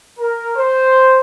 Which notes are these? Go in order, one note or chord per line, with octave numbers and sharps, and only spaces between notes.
A#4
C5